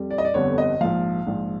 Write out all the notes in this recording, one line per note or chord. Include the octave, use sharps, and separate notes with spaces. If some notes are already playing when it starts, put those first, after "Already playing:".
Already playing: F2 G3
D5
D#5
D5
G1 F2 D3 G3 B3 C#5
D#5
A#1 G#2 F3 F5
A#1 G#2 F3